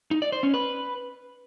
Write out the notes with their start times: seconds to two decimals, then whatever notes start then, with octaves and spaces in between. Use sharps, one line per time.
0.11 D#4
0.22 D5
0.32 C5
0.43 C#4
0.54 B4